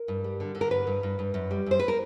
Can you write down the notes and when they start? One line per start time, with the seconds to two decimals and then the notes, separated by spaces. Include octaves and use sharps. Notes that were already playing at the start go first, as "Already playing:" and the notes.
Already playing: A#4
0.08 G2
0.24 G3
0.40 D3
0.55 D3
0.61 A#4
0.71 G2 B4
0.87 G2
1.03 G2
1.19 G2
1.34 F#2
1.51 G3
1.66 F#2 C5
1.80 B4
1.88 A#4